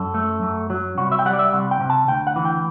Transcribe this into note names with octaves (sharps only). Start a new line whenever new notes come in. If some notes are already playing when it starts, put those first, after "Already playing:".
Already playing: F#2 A4
A3
F#2
F#3
C2 F#4
E5
G5
G3 F#5
D5
E5
C2 F#5
G5
C3
A5
D2 G5
F#5
E3
G5